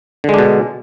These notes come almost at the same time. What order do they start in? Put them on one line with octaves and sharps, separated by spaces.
D3 G#3 D4 B2